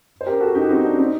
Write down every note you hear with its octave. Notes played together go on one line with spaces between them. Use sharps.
C5
G4 A#4
F#4 A4
D#4 G4
F#4
C4 D#4
D4 F#4
C4 D#4